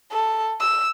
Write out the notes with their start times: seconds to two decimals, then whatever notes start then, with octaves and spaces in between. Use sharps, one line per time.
0.12 A4
0.61 E6